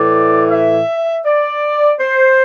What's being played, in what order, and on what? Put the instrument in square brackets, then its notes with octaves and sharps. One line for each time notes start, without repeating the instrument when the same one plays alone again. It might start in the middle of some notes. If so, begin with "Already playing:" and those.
Already playing: [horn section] A2 E3 D5
E5
D5
C5